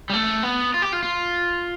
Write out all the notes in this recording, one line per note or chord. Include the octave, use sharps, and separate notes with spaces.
G3
A3
B3
F4
G4
F4
F4